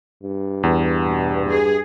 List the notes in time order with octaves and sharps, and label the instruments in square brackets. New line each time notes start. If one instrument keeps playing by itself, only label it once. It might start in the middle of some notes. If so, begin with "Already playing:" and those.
[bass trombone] G2
[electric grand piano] E2
[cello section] B2
G#4